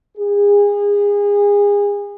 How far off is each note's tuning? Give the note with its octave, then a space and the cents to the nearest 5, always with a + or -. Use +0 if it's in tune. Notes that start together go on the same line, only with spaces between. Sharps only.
G#4 -30